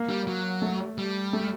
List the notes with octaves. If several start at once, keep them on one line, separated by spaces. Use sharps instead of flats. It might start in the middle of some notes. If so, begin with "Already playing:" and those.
Already playing: A#3
G3
F#3
A3
G3
A3